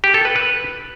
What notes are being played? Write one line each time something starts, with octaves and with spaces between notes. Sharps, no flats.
G4
A4
B4
B4